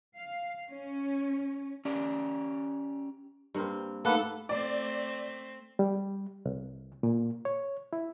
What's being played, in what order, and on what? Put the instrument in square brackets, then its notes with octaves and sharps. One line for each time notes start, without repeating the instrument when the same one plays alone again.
[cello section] F5
C#4
[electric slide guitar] C#4 G4 D5
[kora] G2 A#3 C4
[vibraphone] A3 D#4 [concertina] A#3 B4 F#5 [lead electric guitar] A4
[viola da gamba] A3 C4 [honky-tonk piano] D5
[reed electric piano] G3
C2
A#2
C#5
E4